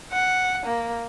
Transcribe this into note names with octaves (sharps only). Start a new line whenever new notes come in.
F#5
A#3